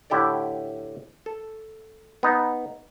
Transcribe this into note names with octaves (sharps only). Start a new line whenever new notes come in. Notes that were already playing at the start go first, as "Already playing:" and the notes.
A2 D3 E4 G4 A4 D5
A4
B3 D#4